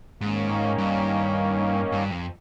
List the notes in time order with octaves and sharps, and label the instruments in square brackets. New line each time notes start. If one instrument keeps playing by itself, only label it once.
[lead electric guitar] G#2 [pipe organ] D#3 A#3 C#4
[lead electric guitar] G2
G2
F2